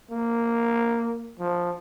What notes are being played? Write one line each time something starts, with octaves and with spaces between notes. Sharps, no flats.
A#3
F3